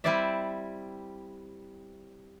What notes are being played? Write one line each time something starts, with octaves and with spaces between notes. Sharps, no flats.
G3 C4 E4 C5 D5 E5